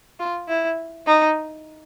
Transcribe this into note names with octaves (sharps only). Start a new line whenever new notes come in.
F4
E4
D#4